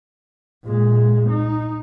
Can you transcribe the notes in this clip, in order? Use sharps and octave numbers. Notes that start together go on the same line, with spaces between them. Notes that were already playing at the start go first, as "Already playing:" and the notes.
A#2 G#3
D#4